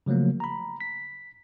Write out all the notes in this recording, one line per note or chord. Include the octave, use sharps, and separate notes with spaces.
C#3 F3 F#3 A3 A#3
A#5 B5
B6